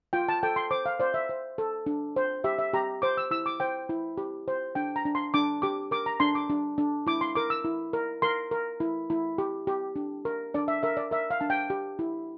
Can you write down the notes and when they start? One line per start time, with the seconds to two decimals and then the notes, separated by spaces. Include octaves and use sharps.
0.13 F4 G5
0.29 A5
0.43 A4 G5
0.56 C6
0.71 C5 D6
0.86 F5
1.00 C5 D5
1.14 E5
1.29 C5
1.58 A4
1.86 D4
2.16 C5
2.44 G4 E5
2.59 E5
2.74 G4 A#5
3.02 C5 D6
3.17 E6
3.31 E4 E6
3.46 D6
3.60 C5 G5
3.89 E4
4.18 G4
4.48 C5
4.75 D4 G5
4.96 A#5
5.05 D4
5.15 C6
5.34 D4 D6
5.62 G4 D6
5.91 A#4 D6
6.06 A#5
6.20 D4 C6
6.35 D6
6.50 D4
6.78 D4
7.07 E4 D6
7.21 C6
7.35 A#4 D6
7.50 E6
7.65 E4
7.93 A#4
8.22 A#4 C6
8.51 A#4
8.80 E4
9.10 E4
9.38 G4
9.67 G4
9.96 D4
10.25 A#4
10.54 D4 D5
10.68 E5
10.83 A#4 E5
10.97 D5
11.11 A#4 E5
11.31 F5
11.40 D4 A5
11.50 G5
11.70 G4
11.99 E4